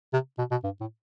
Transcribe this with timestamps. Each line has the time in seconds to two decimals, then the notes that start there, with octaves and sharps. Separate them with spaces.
0.13 C3
0.38 B2
0.51 B2
0.64 G2
0.80 A2